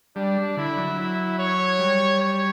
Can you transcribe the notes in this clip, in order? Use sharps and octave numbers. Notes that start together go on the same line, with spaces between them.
G3 D4
D3 E4
F#3
E4
C#5
G3
C#5